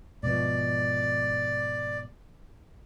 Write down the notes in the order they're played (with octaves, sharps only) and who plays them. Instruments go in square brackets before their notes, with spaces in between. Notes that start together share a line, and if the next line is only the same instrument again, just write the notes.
[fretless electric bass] G#2 B2 F3 [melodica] D5